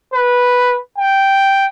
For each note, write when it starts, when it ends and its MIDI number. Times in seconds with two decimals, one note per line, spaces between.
0.14 0.78 71
0.98 1.66 79